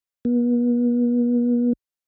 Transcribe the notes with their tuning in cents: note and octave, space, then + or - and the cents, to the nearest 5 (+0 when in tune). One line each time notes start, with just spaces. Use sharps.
B3 -40